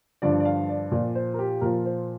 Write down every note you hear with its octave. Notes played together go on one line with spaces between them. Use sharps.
G2 D3 F3 D5
D5
F5
D5
A#2 F3 D5
C5
A#4
G4
A#2 F3 A#4
C5